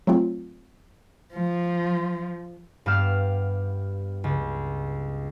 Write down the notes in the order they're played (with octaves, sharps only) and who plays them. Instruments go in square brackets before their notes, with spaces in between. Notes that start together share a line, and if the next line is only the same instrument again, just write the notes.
[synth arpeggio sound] F#3 A3 C4 F4
[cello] F3
[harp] G2 B3 G4 F5 F6 E7
C#2